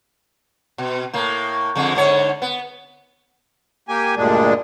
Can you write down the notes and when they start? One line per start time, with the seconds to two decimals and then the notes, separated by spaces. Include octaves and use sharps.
0.78 B2
1.13 A2 A#3
1.75 F2 D3 G#3
1.95 G#2 D3 C#5
2.42 B3
3.89 A#3 G4 G#5
4.16 D2 G2 A#2 G#3 D4